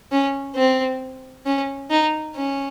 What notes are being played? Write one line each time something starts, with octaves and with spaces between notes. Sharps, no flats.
C#4
C4
C#4
D#4
C#4